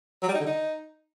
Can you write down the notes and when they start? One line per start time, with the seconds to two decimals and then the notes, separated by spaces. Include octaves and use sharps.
0.23 F#3
0.28 G3
0.34 D#4
0.40 D3
0.46 D#4